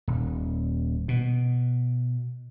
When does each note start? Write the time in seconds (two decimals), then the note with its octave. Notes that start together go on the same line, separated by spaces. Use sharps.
0.08 D#1
1.08 B2